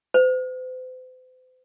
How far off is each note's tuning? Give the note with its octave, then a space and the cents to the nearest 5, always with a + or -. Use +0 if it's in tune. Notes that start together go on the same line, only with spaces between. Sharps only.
C5 -45